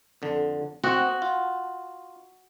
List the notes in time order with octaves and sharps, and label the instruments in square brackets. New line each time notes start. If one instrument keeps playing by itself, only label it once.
[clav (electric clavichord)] F2 D3
[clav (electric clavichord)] C4 D#5 [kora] F#4
[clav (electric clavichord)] F4